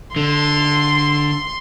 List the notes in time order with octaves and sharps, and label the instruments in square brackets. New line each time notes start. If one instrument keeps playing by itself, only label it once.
[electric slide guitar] D3 [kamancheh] C6